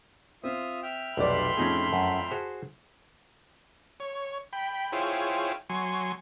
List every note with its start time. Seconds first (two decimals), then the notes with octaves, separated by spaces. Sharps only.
0.44 C4 F4 E5 D#6
0.83 E5 G5 F6
1.17 F1 B1 D5 B5 C6
1.57 F2 A2 C#4 D#4 G#4
1.93 F#2
2.31 F#4 G#4 C5
4.00 C#5
4.53 G5 B5
4.93 E4 F4 G#4 C5 C#5 G5
5.70 F#3 G#5 C6 C#6